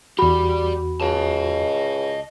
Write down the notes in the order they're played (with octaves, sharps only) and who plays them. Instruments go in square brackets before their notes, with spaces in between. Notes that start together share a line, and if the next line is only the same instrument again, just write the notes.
[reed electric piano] E2 F#4 [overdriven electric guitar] G4 D5 [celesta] B5
[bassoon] C#2 [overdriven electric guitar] D#5 A5